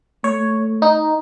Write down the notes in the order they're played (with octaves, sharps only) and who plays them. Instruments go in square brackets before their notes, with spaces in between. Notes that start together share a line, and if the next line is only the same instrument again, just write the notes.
[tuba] A3 [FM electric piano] C#5
[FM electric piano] D#4